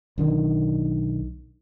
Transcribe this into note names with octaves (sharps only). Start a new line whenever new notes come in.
B1 D3 D#3